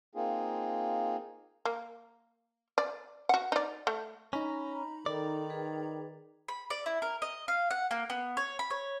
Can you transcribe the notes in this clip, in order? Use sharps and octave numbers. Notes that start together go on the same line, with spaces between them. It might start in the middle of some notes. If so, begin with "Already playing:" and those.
A#3 C4 D#4 F4 G#4
A#3
D5
F#4 F#5
D#4 D5
A3
C#4 D#4 A#5 B5
D#3 A4 D5
G#4 B4 G5
B5
D5
E4
A#4
D#5
F5
F#5
A#3
B3
C#5
B5
C#5